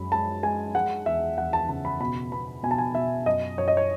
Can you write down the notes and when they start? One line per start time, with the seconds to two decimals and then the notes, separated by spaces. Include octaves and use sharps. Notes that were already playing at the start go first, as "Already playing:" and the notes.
Already playing: F#2 G#3 B5
0.12 G#3 A5
0.43 G#3 G#5
0.75 G#3 F#5
1.06 E2 E5
1.38 E2 F#5
1.53 A5
1.69 C#3 A5
1.85 B5
2.01 B2 B5
2.32 B3 B5
2.63 B2 G#5
2.71 A5
2.78 G#5
2.95 B2 E5
3.26 F#2 D#5
3.58 F#2 C#5
3.68 D#5
3.77 C#5